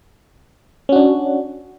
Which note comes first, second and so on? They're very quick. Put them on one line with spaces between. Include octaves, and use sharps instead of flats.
C#4 F#4 D4